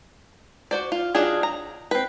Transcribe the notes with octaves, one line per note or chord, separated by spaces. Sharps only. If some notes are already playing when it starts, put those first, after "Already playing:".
F#4 C5 D5
F4
F#3 D4 D#4 F4 G#4
A#5
C4 B4